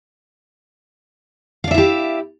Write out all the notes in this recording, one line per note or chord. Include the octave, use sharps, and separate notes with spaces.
D4 E4 G4 E5 F5